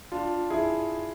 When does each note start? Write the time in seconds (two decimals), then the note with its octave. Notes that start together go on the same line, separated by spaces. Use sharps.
0.12 D4 F4
0.50 E4 G#4